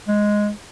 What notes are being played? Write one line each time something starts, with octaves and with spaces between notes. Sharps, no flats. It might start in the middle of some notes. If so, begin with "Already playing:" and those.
G#3